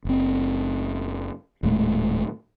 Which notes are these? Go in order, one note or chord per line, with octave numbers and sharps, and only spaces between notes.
F#1 C4
D#1 A2 G#3 A3